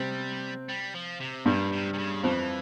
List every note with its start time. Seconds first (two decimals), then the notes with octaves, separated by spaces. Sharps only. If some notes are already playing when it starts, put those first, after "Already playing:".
Already playing: C3 G3 C4
0.69 G3
0.94 F3
1.20 C3
1.45 G2 A#2 G3
1.72 C3
1.93 C3
1.98 C#3
2.23 F2 E3 F3